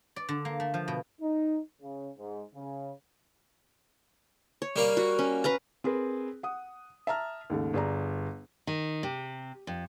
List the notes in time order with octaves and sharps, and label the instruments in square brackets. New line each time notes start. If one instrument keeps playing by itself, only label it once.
[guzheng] D5
D3
A#3
A3
F3
B2
[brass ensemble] D#4
C#3
G#2
C#3
[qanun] C#5
[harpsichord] G3 A#3 F5
[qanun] F#4
C#4
B4 F5 A#5
[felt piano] C4 G#4 A#4 B4
F#5 D#6
E5 A5 A#5 F6
D#2 G#2 C#3 A3
G1 G#4 D5 A#5
[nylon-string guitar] D#3
C3
F2